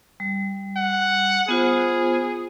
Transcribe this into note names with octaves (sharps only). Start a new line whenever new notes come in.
G3
F#5
B3 F4 G#4 C5